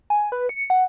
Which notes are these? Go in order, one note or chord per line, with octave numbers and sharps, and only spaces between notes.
G#5
B4
C#7
F#5